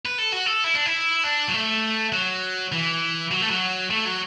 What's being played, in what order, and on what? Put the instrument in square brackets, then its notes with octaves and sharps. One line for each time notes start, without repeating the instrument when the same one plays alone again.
[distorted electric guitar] B4
A4
F#4
A4
E4
D4
E4
D4
F#3
A3
F#3
E3
F#3
A3
F#3
A3
F#3